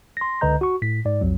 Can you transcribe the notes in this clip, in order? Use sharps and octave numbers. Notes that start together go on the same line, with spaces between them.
C6 A#6
C#2 D3 B4 D#5 A#5 G6
F#4 C#6
A2 B6
G#2 D5
B1 F2 F#3